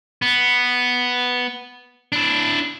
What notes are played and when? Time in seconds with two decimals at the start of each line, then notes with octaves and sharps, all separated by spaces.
0.22 B3
2.12 D4 E4